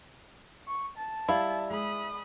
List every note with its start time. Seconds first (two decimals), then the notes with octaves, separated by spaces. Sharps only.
0.67 C#6
0.97 A5
1.29 G3 E4 D5 F5
1.70 G#3 B5 D#6